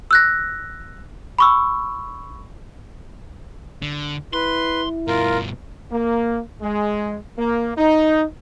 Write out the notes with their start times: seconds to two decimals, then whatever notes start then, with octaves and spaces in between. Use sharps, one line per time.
0.11 E6 F#6 A#6
1.39 B5 C#6 E6
3.82 D3
4.33 E4 B4 C6
5.08 G2 B2 F4 A#4
5.91 A#3
6.61 G#3
7.38 A#3
7.76 D#4